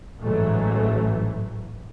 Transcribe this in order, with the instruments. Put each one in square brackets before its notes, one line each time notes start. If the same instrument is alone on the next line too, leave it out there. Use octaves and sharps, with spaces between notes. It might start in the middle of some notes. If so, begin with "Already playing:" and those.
[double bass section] A1 G#2 E3 F#3 A3